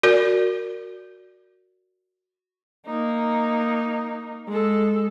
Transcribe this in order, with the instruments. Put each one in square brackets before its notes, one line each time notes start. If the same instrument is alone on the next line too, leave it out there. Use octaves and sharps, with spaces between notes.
[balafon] F#4 A#4 D5
[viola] A#3 D#4
G#3 A4